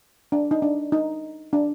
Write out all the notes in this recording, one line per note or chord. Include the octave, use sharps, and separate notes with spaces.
D4
D#4
D4
D#4
D4